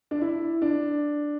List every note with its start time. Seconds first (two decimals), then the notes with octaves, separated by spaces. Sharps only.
0.11 D4
0.21 E4
0.62 D4